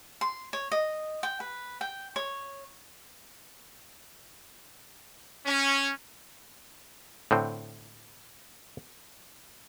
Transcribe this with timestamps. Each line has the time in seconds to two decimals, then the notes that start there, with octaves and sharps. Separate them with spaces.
0.21 C6
0.53 C#5
0.72 D#5
1.23 G5
1.40 B4
1.81 G5
2.16 C#5
5.45 C#4
7.31 A2 D3 C4